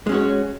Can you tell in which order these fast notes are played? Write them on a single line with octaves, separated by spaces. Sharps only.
G#3 C#4 F#4 C#5